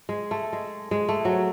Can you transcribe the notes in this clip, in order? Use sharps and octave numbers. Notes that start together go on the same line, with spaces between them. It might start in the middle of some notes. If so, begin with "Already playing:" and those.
G#3
A3
G#3
G#3
A3
F#3